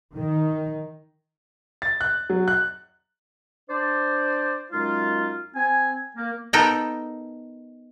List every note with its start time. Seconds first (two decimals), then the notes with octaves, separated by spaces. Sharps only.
0.14 D#3
1.82 A6
2.01 F#6
2.30 F#3
2.48 F#6
3.69 D4 C5 D5
4.71 F#2 G#3 D#4 F4
5.54 C4 G#5
6.16 A#3
6.53 B3 D#4 A4 A#4 G5 A#5